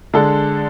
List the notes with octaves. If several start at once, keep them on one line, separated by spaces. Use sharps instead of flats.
D3 G#3 D4 A4